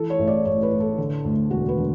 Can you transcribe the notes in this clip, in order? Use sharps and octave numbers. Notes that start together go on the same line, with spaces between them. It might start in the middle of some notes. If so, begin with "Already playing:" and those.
Already playing: E3 A4
C#5
A1
D5
A1 C#5
B4
A1
A4
D3
D2
E1 F#4
B4
D3